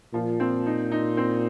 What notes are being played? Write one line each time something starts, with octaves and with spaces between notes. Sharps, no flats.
A#2 F3
C4
D#4
D#4
C4